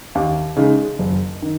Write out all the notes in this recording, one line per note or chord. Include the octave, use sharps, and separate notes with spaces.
D#2
C#3 G#3 D#4
F#1
D#3